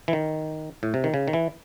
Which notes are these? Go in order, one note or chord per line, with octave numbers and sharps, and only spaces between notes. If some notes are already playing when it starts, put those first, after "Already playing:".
E3
D#3
A2
C3
D#3
C#3
D#3
E3